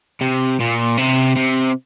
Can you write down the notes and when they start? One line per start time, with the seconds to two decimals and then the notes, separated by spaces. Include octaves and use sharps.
0.21 C3
0.60 A#2
0.98 C3
1.36 C3